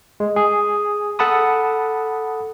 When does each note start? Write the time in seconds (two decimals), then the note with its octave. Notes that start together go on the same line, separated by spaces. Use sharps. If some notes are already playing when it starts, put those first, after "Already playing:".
0.20 G#3
0.36 G#4
1.19 A4 F#5 A5 B5 D#6